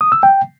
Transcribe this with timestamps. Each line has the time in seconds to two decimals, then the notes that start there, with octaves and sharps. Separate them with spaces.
0.01 D#6
0.12 E6
0.23 G5